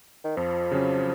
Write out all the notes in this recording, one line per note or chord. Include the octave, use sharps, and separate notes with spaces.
D#3
F2 F3
C#3 F#3 C#4